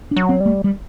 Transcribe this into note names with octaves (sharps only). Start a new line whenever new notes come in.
D4
F#3
C4
G3
A3
G3